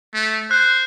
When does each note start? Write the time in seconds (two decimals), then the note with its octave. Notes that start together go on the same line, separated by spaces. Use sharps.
0.14 A3
0.51 C5 F#6